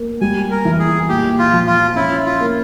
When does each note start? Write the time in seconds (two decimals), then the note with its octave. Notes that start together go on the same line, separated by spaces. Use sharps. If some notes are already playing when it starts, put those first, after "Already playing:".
Already playing: A#3
0.21 G3 G#5
0.51 A#4
0.65 E3
0.79 G#4
1.09 A#2 G4
1.39 F4
1.53 F3
1.67 F4
1.96 C#4 E4
2.26 F4
2.40 A#3